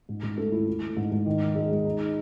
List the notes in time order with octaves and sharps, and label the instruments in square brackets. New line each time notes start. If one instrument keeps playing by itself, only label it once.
[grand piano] G#2
G#2
A3
E4
E4
A3
G#2
G#2
D#3
D#4
G#3
G#3
D#4
D#4